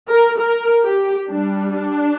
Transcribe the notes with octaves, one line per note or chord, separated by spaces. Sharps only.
A#4
A#4
G4
G3 D4
D4